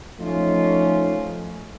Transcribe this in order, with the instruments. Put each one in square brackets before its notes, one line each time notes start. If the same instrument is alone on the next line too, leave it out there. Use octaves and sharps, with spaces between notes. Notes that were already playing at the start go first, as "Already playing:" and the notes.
[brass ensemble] F3 A3 C#4 D#4 F4